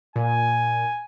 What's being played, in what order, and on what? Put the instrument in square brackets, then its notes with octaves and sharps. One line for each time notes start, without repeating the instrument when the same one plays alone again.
[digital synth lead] A#2 [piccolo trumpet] G#5